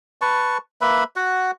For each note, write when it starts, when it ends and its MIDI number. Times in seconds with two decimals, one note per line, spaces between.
0.22 0.58 71
0.22 0.58 81
0.22 0.58 85
0.81 1.04 58
0.81 1.04 71
0.81 1.04 76
0.81 1.04 83
1.16 1.51 66
1.16 1.51 78